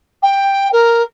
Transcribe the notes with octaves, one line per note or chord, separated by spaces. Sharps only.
G5
A#4